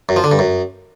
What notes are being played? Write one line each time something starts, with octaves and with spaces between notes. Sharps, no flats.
F#2
F3
D3
G2
F#2